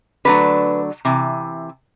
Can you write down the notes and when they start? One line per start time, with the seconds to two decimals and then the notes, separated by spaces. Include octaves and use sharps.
0.25 D3 F#3 A3 D4 B4
1.05 C3 E3